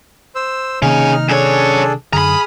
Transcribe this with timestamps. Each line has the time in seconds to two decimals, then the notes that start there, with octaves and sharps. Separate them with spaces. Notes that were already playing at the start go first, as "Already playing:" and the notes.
0.35 C5 E6
0.82 C3 D#3 A#3 C#4 D#4 G#4 F6
1.29 F#2 D4 G#4 A4 C#5
2.13 F#2 D3 G#4 A#5 B5 D#6 F6